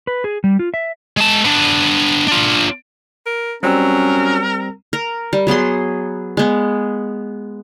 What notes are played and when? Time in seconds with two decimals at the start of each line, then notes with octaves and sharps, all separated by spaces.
0.07 B4
0.24 G#4
0.44 G3
0.59 F4
0.74 E5
1.17 G#3 A5
1.44 B3 D4
2.28 D4 F4
3.26 A#4
3.63 F#3 G3 C4 C#4 A#4 E6
4.93 A#4
5.33 G3
5.47 F#3 B3 G#4 C6
6.37 G#3 B3